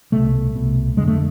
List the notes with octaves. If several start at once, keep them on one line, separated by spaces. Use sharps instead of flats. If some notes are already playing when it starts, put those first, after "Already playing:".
C2 B2 A3
C2 B2
F2 D3 G#3
A3